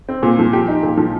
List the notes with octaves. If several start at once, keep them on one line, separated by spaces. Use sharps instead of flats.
C4
A#2
F3
G4
D#4
A#2
F3